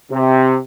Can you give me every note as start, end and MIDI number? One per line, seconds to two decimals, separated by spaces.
0.11 0.58 48